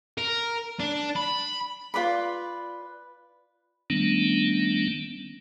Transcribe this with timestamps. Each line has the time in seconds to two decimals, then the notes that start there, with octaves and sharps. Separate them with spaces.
0.18 A#4
0.80 D4
1.16 B5
1.94 F4 B4 D5 B5
3.90 D#3 G3 A3 B3 C#4 D4